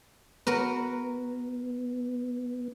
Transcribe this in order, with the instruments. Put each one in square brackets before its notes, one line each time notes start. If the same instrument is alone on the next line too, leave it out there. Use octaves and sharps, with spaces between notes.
[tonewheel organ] B3 [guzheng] F#4 A#4 B4